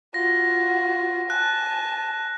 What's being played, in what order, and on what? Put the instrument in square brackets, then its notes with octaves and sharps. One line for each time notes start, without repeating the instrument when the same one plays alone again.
[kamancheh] F4 F#4 [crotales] A#6
[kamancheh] G#5 A5 [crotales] F#6